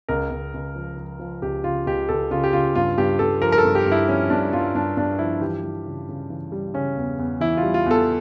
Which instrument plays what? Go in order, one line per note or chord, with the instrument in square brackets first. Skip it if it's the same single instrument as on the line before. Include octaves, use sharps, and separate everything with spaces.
[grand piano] C#2 A#4
C#2
C#2
F3
F3
F3
C#2 G4
C#3 F4
C#2 G4
C#2 A4
C#3 F4
G4
C#3 F4
G2 F4
G2 G4
G2 A4
F3 A#4
A#4
A4
G2
G4
G2
E4
F3 C#4
G2 D4
G2 F4
G2 D4
G2 D4
F3 E4
E3 G4
E3
C#3
C#3
E3
G3
C#3 C#4
E2
E2
E3 E4
F4
G3
F4
E2 A4